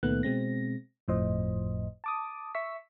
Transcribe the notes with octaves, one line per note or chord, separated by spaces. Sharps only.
C#2 A#2 D#3 A3 B3 F#6
B2 G#3 C4 A#6
G1 F2 A2 F3 C5 D#5
A5 D6 D#6
E5 C#6 E6 B6